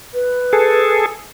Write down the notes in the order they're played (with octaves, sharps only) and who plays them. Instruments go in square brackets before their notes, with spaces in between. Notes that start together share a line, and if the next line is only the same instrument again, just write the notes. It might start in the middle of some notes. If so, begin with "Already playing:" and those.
[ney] B4
[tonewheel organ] G#4 A4